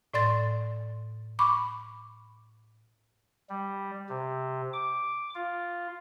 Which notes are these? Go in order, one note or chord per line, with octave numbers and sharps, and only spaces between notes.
A2 D5 C6 A6
B5 C#6 D6
G3
C3
D6
F4